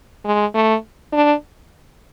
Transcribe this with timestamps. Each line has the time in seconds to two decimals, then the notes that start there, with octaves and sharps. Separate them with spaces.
0.25 G#3
0.55 A3
1.13 D4